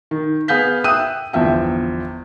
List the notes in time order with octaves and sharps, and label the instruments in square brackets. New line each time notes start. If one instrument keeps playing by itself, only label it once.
[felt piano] D#3
B3 G#4 F5 G6 B6
E5 G5 D#6 E6 F#6 D#7
G1 E2 F3 E5 G5